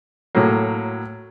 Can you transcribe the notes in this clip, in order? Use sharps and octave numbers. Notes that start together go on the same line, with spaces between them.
A2 F#3 A#3